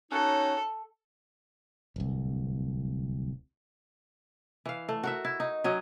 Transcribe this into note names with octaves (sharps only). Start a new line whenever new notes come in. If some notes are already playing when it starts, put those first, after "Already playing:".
C#4 D#4 F#4 A4
D1 C2
E3 F5
A3
F#4 A#4 E5
E4
D#4
F#3 C#4 D#5